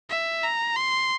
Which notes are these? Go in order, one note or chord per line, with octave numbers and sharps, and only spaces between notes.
E5
A#5
C6